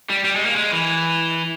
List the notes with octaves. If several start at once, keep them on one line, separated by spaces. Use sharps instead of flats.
G3
G3
G#3
A#3
G#3
E3